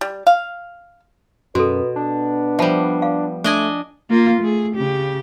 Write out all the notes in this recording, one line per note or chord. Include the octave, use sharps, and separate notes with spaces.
G3
F5
F#2 B2 F#4 A4 B4
B3 D4
F3 G3 E5 A5 B5
F5
A3 D4 D#5 G#5
A#3 F4
A3 G#4
C#3 G4